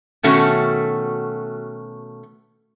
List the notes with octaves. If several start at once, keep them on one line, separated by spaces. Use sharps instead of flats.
B2 D#3 A3 C#4 F#4